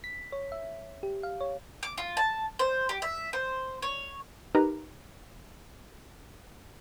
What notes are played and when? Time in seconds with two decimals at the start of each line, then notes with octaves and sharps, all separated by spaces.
0.04 B6
0.32 C#5
0.52 E5
1.03 G4
1.23 F5
1.41 C#5
1.83 D6
1.98 F4
2.17 A5
2.59 C5
2.89 G4
3.02 E5
3.33 C5
3.82 C#5
4.55 D#4 G4 A#4 B4 A#5